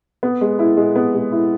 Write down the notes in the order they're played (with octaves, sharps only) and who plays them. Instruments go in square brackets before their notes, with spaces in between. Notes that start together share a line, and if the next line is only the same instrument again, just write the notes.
[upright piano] B3
G#3
E4
G#3
B3
G#3
E4